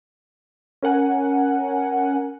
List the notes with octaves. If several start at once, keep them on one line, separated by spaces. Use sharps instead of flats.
C#4 A#4 F#5 G#5